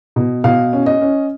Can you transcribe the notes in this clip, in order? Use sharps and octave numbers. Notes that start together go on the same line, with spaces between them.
B2
B2 F5
C#4
D#5
C#4